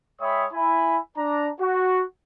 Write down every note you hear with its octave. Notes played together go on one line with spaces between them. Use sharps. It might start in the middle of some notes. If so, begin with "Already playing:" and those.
G#3 C#5 E5 G5 B5 D#6
E4 G#5 B5
D4 A#5
F#4